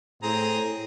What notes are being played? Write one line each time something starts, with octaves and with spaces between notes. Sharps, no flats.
A2 C4 G#4 A#5